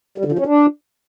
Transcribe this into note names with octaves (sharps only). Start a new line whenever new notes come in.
G3
D3
F3
C#4
D4